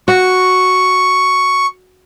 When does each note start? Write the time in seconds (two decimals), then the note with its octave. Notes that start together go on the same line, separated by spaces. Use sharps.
0.08 F#4 C#6